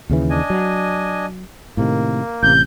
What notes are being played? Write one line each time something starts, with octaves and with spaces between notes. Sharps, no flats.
D#2 C#3 E3
D4 D#5 G#5
F#3
A2 C3 D#3 A#3
A1 C3 G6